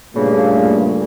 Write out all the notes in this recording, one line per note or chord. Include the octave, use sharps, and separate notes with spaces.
G2 A#2 C#3 A3 A#3